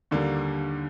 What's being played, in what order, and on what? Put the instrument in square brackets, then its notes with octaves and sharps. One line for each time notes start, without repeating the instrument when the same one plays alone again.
[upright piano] D#2 D3 G3 A#3